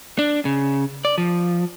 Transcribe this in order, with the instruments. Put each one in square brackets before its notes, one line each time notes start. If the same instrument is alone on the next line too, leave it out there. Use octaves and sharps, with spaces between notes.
[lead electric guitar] D4
C#3
D5
F3